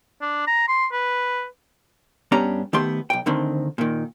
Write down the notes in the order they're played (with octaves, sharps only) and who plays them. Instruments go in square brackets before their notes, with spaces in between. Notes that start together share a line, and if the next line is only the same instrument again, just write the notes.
[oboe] D4
A#5
C6
B4
[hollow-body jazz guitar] G2 B3 C#4 D4 G4 A#5
D#3 A3 B3 G4 C6
B1 G5
D2 D3 D#3 C4
A#2 D#3